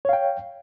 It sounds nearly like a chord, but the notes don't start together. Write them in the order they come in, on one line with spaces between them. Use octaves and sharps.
C#5 F5 G5